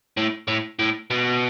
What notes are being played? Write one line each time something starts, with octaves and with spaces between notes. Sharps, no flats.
A2
A2
A2
B2